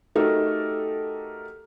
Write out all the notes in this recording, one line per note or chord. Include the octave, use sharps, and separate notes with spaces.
A3 D#4 F#4 G4 A4 A#4